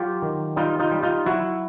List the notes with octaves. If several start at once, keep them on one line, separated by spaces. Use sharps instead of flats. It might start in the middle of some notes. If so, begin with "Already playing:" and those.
Already playing: F#3 F4 G4
D#3
G3 D#4 F4
D#4 F4
G3
D#4 F4
F#3 E4 F#4